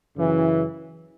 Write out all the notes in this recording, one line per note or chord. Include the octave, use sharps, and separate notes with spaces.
F#2 C#3 E3